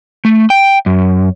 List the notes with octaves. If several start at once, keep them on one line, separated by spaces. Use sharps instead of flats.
A3
G5
F#2